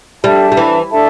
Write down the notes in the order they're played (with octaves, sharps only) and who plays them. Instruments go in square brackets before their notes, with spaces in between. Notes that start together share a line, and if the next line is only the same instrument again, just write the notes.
[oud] G3 [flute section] D4 A4 E5 A5
[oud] G3
E3
[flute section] D4 A4 E5 A5